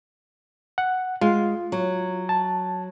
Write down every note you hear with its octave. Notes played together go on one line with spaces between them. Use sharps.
F#5
G#3 F4
F#3
A5